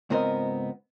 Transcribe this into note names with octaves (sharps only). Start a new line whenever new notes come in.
C#2 G#2 B3 C4 A#4 D#5